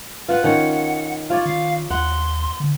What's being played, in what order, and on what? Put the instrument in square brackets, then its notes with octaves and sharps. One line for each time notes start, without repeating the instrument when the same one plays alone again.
[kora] F4 F#5 [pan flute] B4
[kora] D#3 C#4 [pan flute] F#5
[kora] F4 C#5 D5
[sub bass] D#3 [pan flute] F5
[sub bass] D#2 [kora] F#5 [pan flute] C6
[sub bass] D3